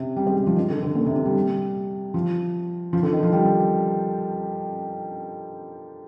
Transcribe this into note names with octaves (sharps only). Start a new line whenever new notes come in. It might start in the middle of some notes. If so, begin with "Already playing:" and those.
Already playing: C3
G3
G#3
G3
F3
D#3
D3
D3
A#2
C3
D3
G3
F3
F3
D3
D#3
F3
G3